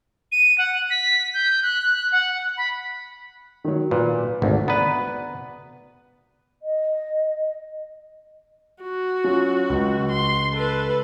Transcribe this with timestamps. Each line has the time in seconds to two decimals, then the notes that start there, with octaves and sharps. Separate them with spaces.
0.32 D#7
0.58 F#5
0.90 B6
1.34 G6
1.63 F#6
2.12 F#5
2.57 B5
3.64 D#3 F#3
3.91 A#2 B4
4.42 G#1 D2
4.68 B3 B4 D5 A#5
6.63 D#5
8.83 F#4
9.24 F#3 C#4 F4
9.69 C#2
10.11 C6
10.53 A4 B4